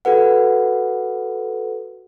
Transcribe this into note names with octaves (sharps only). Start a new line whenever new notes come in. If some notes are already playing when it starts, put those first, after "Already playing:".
F#4 A4 B4 F#5